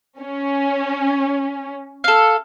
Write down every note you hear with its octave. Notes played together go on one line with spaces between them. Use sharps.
C#4
A4 F5